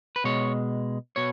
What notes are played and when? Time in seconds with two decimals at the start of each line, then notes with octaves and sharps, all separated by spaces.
0.16 B4
0.24 B2 G#3 C#5
1.16 B2 C#5